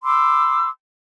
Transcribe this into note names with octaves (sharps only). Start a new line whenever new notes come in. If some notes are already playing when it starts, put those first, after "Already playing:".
B5 C6 D6 E6